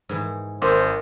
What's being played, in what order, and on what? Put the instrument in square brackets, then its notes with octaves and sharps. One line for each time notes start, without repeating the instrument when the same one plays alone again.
[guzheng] G#2 E3
[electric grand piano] G#1 [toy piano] A#4 C6 D6 [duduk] C5